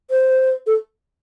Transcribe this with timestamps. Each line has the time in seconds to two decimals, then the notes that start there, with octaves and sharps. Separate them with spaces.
0.11 C5
0.67 A4